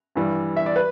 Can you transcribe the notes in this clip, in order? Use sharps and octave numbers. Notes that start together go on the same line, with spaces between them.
G2 E3 G3
E5
D5
B4